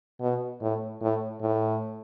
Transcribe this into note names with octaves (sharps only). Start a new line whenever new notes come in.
B2
A2
A2
A2